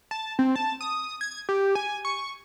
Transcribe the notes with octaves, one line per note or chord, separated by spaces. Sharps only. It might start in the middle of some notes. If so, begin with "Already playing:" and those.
A5
C4
A5
D#6
G#6
G4
G#5
C#6